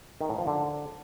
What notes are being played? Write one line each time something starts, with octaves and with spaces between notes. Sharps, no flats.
D#3
A2
F3
D3